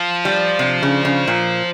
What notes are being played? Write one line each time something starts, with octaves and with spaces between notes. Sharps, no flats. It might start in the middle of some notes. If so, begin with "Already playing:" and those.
Already playing: F3
G3
C3
C#3
C#3
A#2